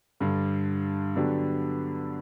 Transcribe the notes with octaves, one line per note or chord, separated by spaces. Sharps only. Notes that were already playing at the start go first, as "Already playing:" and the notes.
G2 D3 G3
D3 F#3 B3 D4 G4